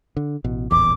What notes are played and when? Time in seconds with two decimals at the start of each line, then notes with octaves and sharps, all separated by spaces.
0.17 D3
0.44 A1 B2
0.71 D#1 A1 E2 D6